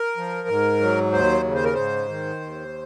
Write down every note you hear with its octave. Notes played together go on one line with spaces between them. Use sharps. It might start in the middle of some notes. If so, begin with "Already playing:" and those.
Already playing: A#4
F3
G#2
F#3
D#2 C5
C#3
C5
A#4
G#2 C5
D#3
D#2